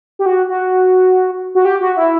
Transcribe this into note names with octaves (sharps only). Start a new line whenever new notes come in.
G4
F#4
F#4
F#4
G4
F#4
E4